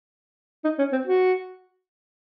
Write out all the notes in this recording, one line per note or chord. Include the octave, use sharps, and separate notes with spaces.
D#4
C#4
C4
F#4